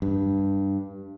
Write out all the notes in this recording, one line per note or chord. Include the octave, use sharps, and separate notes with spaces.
G2